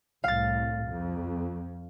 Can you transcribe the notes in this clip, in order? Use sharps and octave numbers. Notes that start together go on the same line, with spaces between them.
C2 A2 F5 A6
F2